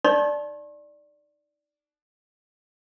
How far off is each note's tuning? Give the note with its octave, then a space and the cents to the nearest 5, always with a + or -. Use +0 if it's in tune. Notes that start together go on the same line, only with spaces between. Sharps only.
D#4 +0 D5 +0 C#6 -45